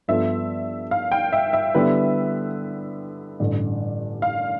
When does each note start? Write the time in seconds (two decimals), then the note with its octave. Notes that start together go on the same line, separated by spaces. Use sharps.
0.08 G2 F3 B3 F4 A4 E5
0.91 F5
1.12 G5
1.33 E5
1.53 E5
1.74 D3 G3 B3 E4 B4
3.40 A1 G2 D3
4.22 F5